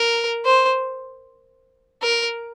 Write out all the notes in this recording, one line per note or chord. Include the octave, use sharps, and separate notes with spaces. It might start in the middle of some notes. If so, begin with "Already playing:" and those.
Already playing: A#4
C5
A#4